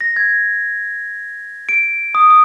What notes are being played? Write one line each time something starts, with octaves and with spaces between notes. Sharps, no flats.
A#6
G#6
D7
D#6
D#6